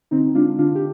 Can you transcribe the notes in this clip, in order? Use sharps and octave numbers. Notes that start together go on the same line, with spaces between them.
D3 C4 D#4
G#3 D4 F4
D3 D4 F4
G4